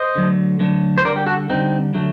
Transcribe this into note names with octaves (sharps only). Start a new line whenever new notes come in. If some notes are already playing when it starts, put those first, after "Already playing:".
Already playing: C5 D#5
D3 F#3 A3
D3 F#3 A3
C5
D3 G3 A#4 D5
G4
F#4 A4
D3 G3 C4 D#4
D3 F#3 A3